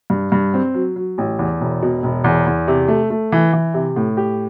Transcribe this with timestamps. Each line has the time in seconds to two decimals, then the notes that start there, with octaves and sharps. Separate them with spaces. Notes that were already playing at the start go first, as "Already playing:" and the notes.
0.10 G2
0.32 G2
0.54 C4
0.74 F#3
0.96 F#3
1.18 A1
1.39 E2
1.61 E1
1.82 B2
2.03 E1
2.24 E2
2.46 E2
2.68 C3
2.88 A3
3.10 A3
3.32 E3
3.53 E3
3.74 C3
3.96 A2
4.17 G4